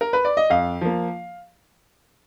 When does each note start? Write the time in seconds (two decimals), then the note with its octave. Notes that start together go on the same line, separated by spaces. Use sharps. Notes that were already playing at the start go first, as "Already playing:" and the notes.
0.01 A#4
0.13 B4
0.25 D5
0.37 D#5
0.50 F2 F5
0.81 F3 A#3